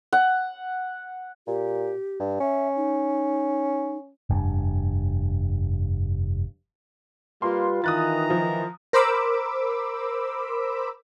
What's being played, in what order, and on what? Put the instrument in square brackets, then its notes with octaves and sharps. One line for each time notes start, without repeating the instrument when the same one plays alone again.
[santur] F#5
[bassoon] A#2 [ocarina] G4
[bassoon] G2
[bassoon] C#4 [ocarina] E5
[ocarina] D#4
[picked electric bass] F1 G2
[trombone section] G3 G4 B4 [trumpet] A#3 [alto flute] F4 [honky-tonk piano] C6
[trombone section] D#3 E3 [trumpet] A#5 [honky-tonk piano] D#6 F#6 A6
[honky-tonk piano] F3
[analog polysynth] A#4 C5 B5 D6 E6